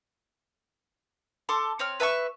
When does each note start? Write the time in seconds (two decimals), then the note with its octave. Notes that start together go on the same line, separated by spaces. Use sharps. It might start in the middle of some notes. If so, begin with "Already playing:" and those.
1.49 A4 C6 D6
1.79 C4 C#5 F6
2.00 B4 E5 A5 C#6